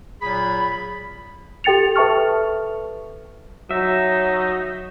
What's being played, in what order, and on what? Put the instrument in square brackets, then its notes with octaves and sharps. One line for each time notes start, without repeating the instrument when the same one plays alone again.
[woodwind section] A#2 F#3 G#4 B5
[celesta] G4 A4 G5 A6 C#7 F7
A4 B4 E5 A5 C#6 F6
[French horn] F#3 [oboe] D#4 [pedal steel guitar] E5